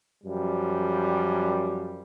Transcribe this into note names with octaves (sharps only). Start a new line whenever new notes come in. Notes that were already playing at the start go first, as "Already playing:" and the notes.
F#2 F3 G3